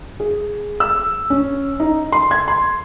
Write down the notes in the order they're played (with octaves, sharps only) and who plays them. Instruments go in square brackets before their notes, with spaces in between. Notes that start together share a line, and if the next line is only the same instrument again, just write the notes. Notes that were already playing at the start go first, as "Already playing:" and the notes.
[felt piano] G#4
E6
C#4
D#4
C6
G#6
C6